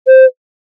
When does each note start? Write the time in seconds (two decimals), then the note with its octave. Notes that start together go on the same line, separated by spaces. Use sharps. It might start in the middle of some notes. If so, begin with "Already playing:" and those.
0.07 C5